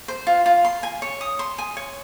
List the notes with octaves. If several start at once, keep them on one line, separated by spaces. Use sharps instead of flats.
C5
F4
F4
C6
G#5
C#5
D#6
C6
G#5
C#5